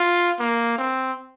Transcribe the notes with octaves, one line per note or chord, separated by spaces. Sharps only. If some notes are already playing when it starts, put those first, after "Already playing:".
Already playing: F4
A#3
C4